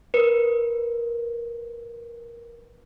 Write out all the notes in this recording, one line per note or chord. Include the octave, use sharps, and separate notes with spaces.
A#4 B4